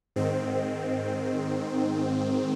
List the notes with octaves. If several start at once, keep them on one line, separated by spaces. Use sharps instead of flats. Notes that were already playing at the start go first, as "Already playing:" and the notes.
G#2 D#3 C4